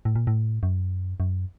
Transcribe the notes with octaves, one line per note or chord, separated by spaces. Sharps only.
A2
A#2
A2
F#2
F#2